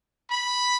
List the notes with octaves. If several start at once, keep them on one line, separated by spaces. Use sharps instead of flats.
B5